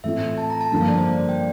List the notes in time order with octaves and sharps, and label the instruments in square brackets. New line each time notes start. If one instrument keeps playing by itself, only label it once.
[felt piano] A2 E3 A3 C4 F4 [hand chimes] E5
[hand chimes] A5
A#5
A5
[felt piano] G2 D3 F3 A#3 [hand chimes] A5
[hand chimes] F5
D5
C5
D5
D5
G5